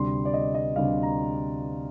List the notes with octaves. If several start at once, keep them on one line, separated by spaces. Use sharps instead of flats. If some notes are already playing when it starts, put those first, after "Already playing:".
Already playing: D2 C3 G3 D4 C6
D5
D#5
D#5
D2 C3 G3 D4 F5
A#5